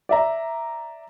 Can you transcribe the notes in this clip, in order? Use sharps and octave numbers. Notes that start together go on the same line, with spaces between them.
D5 E5 A#5